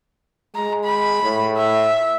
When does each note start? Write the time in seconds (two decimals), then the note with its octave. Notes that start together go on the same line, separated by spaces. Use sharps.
0.55 G#3 A#5
0.84 B5
1.23 A2
1.56 E5